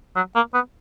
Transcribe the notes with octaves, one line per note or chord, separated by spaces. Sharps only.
F#3
A#3
B3